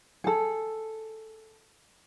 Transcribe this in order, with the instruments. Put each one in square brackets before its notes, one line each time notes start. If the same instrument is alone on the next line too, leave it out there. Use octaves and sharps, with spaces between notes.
[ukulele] G#4 A4